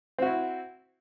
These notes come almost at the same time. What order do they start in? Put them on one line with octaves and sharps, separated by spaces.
C4 F#4 E4